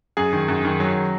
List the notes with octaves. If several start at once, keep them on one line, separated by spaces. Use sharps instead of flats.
F#2 G#4
D#3
F#2
D#3
F#3